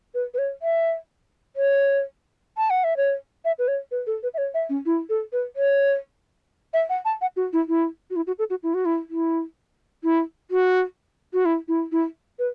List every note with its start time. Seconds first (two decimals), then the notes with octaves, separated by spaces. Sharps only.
0.14 B4
0.34 B4
0.38 C#5
0.62 E5
1.56 C#5
2.57 A5
2.70 F#5
2.84 E5
2.97 C#5
3.45 E5
3.59 B4
3.68 C#5
3.91 B4
4.07 A4
4.23 B4
4.34 E5
4.38 C#5
4.54 E5
4.69 C#4
4.86 E4
5.09 A4
5.32 B4
5.56 C#5
6.74 E5
6.89 F#5
7.05 A5
7.21 F#5
7.36 F#4
7.53 E4
7.68 E4
8.10 F#4
8.16 E4
8.27 F#4
8.39 A4
8.50 F#4
8.63 E4
8.74 F#4
8.85 E4
9.10 E4
10.03 E4
10.51 F#4
11.33 F#4
11.45 E4
11.68 E4
11.92 E4
12.39 B4